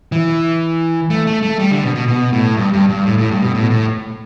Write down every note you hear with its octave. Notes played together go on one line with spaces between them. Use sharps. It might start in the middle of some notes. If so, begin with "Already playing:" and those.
E3
A3
A3
A3
G3
D3
B2
B2
B2
A2
G2
G2
G2
A2
A2
G2
B2
A2
A2